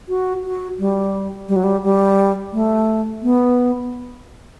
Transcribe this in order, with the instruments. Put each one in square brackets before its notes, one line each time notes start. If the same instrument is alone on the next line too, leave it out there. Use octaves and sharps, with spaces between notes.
[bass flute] F#4
F#4
G3
G3
F#3
G3
G3
A3
B3